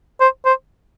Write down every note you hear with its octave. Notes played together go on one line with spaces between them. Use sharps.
C5
C5